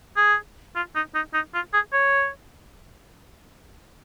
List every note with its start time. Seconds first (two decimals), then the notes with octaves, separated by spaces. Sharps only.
0.17 G#4
0.76 F4
0.95 D#4
1.15 D#4
1.34 D#4
1.54 F4
1.73 G#4
1.93 C#5